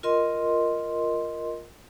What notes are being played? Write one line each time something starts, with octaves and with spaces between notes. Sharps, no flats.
F4 A#4 D#5 C6